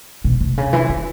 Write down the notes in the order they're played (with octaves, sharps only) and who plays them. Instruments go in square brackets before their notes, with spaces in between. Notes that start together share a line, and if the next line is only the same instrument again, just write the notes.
[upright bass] B2
C3
C#3
E3
D#3